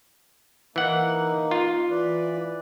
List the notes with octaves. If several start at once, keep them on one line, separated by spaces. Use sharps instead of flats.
E3 A#3 D#4 F#5
F4
E3 B4 D5